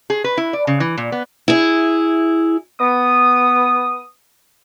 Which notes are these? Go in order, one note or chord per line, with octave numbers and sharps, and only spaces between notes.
G#4
B4
E4
D5
C#3
E3
A#2
B3
E4 G#4
B3 D#6